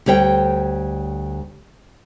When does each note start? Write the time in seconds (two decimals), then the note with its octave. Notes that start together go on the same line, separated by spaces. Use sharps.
0.06 D2 G3 C#5 E5 G5